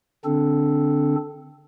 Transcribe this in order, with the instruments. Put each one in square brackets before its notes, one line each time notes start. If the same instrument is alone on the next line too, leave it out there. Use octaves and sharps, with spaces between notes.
[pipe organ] D3 C4 D4 A4